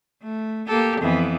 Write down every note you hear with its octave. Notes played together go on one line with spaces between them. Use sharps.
A3
A#3 G4 A4
F2 E3 B3